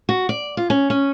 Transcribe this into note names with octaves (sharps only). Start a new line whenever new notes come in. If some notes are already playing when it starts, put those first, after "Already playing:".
F#4
D5
F4
C#4
C#4